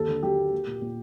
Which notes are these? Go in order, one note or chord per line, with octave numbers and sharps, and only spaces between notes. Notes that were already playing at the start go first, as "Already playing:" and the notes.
Already playing: D#2 A4
D3
F#3 G4
A#3
A#3
A#2
A#2